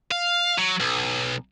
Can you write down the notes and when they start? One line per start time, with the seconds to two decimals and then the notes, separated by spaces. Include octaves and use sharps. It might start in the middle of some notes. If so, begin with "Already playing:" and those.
0.12 F5
0.58 F#3
0.80 B1